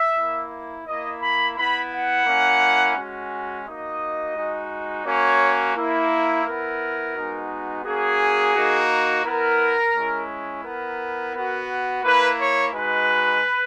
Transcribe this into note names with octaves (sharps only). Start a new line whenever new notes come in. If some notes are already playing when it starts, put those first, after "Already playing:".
Already playing: E5
A#3 E4
A#3 E4 D#5
B5
B3 E4 B5
F#5
A#3 C#4 E4
G#3 C#4 F#4
A#3 D#4 F#4 D#5
G#3 D#4 F#4
A#3 C#4 F#4 C#5
A#3 E4
B3 E4 A#4
G#3 B3 D#4 F#4
A#3 C#4 F#4 G#4
A#3 D#4 F#4
B3 E4 A#4
G#3 C#4 E4
B3 E4 A#4
B3 F#4
A#3 E4 B4
C#5
G#3 D#4 F#4 B4